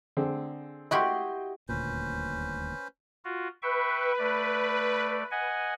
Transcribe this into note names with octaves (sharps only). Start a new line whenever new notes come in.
D3 C4 G#4
E4 F#4 G4 D#5 G5 C6
D#1 D2 A#2 C#4 B4 C5
F4 F#4
B4 E5 G5 C#6
A3 D5
D#5 F#5 G#5